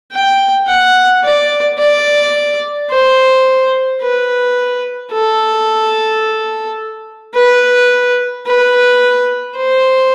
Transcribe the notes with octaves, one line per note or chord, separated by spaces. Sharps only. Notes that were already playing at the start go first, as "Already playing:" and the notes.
G5
F#5
D5
D5
C5
B4
A4
B4
B4
C5